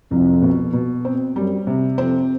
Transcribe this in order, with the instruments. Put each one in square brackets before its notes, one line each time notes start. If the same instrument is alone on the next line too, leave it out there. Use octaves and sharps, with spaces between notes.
[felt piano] C2 [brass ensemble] F2
[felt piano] B2
B2
C4
[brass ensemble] F#2 [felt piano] G3
[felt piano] C3
[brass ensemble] F2 [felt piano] C4